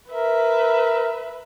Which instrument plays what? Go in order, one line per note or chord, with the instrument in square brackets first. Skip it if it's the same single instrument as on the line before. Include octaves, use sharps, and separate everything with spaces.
[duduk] A#4 [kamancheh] B4 E5